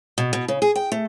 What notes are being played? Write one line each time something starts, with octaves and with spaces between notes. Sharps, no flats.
B2
B2
C#3
G#4
G5
A3